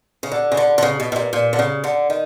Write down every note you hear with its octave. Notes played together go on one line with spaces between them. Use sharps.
C#3
D3
C#3
D3
D3
C#3
B2
B2
A#2
A#2
D3
C#3
D3
D#3